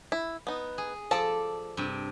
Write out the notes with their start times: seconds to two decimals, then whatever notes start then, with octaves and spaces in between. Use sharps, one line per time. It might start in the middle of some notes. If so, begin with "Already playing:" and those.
0.12 E4
0.47 B3 D#4
0.78 G#4
1.11 F3 A4 D5 A5
1.77 G2 C3